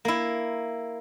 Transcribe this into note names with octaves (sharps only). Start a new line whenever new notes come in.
A#3 E4